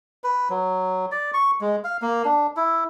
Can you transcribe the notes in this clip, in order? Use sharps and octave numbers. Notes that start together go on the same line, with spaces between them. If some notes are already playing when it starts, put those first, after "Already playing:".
B4
F#3
D5
C#6
G#3
F5
A#3
D4
E4